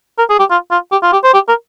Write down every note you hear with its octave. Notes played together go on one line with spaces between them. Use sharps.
A#4
G#4
G4
F4
F4
G4
F4
G4
C5
G4
A#4